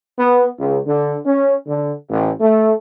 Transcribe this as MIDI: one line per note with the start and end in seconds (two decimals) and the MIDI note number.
0.19 0.46 59
0.58 0.77 37
0.86 1.16 50
1.24 1.52 61
1.65 1.92 50
2.09 2.30 33
2.40 2.73 57